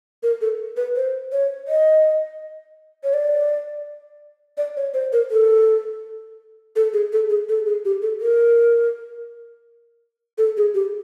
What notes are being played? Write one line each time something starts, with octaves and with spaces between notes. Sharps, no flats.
A#4
A4
B4
C5
C#5
D#5
C#5
D5
D5
C#5
C5
A#4
A4
A4
G#4
A4
G#4
A4
G#4
G4
A4
A#4
A4
G#4
G4